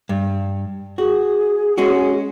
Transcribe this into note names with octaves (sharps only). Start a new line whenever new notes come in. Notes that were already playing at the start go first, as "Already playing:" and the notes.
G2
F#4 G#4
G#3 C#4 F#4